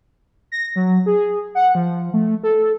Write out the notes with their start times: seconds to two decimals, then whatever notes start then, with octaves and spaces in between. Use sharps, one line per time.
0.52 A#6
0.76 F#3
1.06 G#4
1.55 F#5
1.75 F3
2.14 A3
2.43 A4